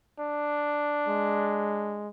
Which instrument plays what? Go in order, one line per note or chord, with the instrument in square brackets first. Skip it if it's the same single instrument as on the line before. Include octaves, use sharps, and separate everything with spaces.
[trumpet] D4
[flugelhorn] G#3